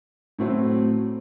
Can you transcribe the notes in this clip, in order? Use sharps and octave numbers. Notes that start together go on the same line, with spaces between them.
A2 F#3 A3 C4